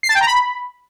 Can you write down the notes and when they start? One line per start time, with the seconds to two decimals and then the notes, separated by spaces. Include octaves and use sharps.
0.03 C7
0.09 A5
0.15 G5
0.21 A#5
0.27 B5